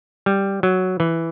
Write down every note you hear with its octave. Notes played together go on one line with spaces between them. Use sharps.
G3
F#3
E3